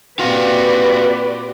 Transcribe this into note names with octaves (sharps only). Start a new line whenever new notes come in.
A#2 C4 F#4 G4 B4 D5 F5